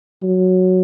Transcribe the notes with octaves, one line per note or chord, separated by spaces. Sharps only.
F#3